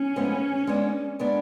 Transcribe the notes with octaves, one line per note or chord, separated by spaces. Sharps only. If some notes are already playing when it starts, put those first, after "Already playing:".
Already playing: C#4
A2 F3 G#3 B3
G#3 B3 D4
G#3 B3 D4